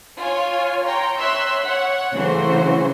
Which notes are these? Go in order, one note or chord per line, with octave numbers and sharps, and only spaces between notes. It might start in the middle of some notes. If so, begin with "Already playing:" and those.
F4 C#5 G#5
C#5 G5 A#5 C6
C#5 E5 C6 E6 F#6
C#5 F#5
C#3 E3 F#3 A3 F#4 C5